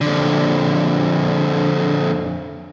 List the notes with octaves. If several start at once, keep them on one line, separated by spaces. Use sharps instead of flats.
F2 D3